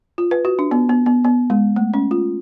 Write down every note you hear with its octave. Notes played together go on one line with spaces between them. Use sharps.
F4
B4
F#4
D4
B3
B3
B3
B3
G#3
A3
C#4
F4